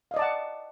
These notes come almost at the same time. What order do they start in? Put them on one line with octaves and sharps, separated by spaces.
F5 D#5 D5 A5 F#5